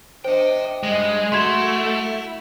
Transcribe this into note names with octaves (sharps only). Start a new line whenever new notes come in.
D4 C5 D#5 E5 G5
G2 G#3 D#5
A3 E4 F#4 C6 G#6